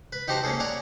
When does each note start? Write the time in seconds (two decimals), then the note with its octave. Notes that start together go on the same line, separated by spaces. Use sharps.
0.12 B4
0.28 D#4 F#4 G4 C5 A5 A#5
0.43 A#3 C#4 G#4 A4
0.60 C#5 D5 F#5 G#5 A#5